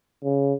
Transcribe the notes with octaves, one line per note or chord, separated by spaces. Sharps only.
C#3